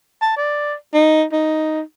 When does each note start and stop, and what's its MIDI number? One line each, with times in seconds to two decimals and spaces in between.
0.22 0.34 81
0.37 0.74 74
0.94 1.24 63
1.32 1.81 63